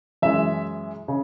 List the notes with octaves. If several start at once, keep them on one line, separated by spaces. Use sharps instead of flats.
F#2 E3 G#3 E5
C#3